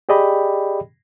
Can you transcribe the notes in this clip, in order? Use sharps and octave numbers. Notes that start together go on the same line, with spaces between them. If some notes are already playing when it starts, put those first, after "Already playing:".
G4 G#4 D5 D#5 G5 B5